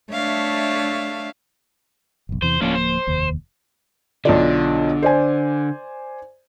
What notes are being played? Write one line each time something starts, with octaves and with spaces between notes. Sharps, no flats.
A3 D4 C#5 E5 F5
F#1 B1
E2 C3 E3 C5
D1 F3 A#3 C#4 D4 F4
C5
F1 D#2
B1 D3 F4 D5
C5 D5 G#5